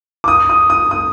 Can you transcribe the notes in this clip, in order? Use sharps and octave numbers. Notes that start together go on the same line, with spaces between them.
D6
D#6
D#6
D#6
D#6